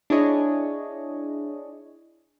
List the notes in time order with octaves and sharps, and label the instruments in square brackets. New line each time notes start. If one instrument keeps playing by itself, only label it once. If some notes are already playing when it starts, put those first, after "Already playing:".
[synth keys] D4 E4 G#4 C#5 D#5